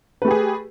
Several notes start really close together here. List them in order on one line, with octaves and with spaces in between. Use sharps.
B4 A3 G4 G#4